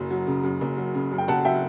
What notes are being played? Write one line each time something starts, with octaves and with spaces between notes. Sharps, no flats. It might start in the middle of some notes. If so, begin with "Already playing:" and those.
Already playing: F#1 F#2
F#3
C#3
F#2
F#1
F#3
C#3
F#2
G5
F#1 F#5 A5
F#3 E5 G5